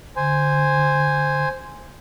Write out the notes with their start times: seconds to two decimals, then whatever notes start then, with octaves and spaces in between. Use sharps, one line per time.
0.16 D3 C5 G#5